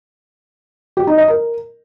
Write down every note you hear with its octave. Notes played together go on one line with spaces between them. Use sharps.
G4
D#4
D#5
A#4